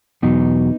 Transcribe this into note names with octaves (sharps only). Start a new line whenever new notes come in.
E2 B2 F#3 B3 D#4